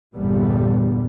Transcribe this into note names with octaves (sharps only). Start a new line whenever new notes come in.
G1 E2 A#2 G3 B3